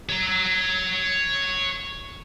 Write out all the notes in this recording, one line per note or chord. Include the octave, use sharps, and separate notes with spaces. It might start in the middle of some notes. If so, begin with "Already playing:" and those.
C#5 A#5